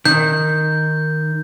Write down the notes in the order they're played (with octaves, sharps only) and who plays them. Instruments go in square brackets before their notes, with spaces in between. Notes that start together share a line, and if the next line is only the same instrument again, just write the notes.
[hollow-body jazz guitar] D#3 [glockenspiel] G6